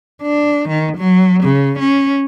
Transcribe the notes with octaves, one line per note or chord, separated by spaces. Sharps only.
D4
D#3
F#3
C#3
C#4